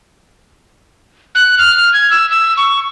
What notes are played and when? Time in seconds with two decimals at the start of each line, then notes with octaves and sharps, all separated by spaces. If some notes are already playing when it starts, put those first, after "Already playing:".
1.35 F#6
1.58 F6
1.93 G#6
2.10 E6
2.30 E6
2.57 C#6